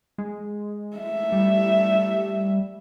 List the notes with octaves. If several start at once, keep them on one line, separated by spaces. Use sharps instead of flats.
G#3
A3 E5
G3